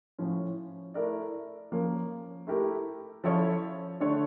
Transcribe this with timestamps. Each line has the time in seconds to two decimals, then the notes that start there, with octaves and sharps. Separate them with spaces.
0.19 A2 F3 C#4
0.94 A3 E4 A#4 D5
1.72 F3 A#3 C#4
2.47 A3 E4 G4 A#4
3.24 F3 C#4 E4 A4 C#5
4.00 D3 A3 D4 A4 C#5